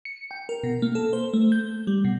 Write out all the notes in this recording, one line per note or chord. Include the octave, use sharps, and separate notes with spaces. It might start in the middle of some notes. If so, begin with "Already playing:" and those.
C#7
G5
A#4
B2
A#3
A4
C5
A3
G6
G3
B2